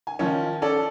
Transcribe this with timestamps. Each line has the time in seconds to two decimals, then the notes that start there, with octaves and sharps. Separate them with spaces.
0.07 G#5
0.19 D#3 F3 C#4
0.62 C#4 A4 D5